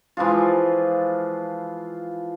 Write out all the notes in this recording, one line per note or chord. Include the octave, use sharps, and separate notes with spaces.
E3 F3 G#3 F4